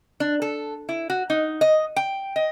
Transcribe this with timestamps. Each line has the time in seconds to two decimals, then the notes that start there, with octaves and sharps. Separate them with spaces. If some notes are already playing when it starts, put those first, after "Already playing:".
0.20 D4
0.42 A4
0.89 E4
1.10 F#4
1.30 D#4
1.61 D#5
1.96 G5
2.36 D#5